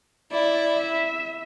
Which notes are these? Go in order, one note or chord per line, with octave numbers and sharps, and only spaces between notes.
E4 D5
E5